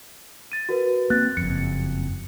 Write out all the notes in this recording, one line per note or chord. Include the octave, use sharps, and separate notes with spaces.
A6 D#7
F#4 A#4 B4
A#3 C4 F#6 A6
F#1 F2 C#7